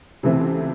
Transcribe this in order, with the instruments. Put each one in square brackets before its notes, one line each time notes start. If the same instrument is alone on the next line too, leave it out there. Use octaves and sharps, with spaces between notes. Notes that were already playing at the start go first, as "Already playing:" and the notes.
[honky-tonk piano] C#2 C3 E3 A3 C4